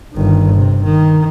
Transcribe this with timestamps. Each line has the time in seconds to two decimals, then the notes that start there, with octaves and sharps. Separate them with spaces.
0.14 G1 D#3
0.55 C3
0.84 D#3